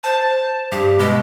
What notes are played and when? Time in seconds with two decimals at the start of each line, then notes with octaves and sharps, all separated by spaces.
0.04 C5 A5
0.72 G2 G4
0.99 B2 G#3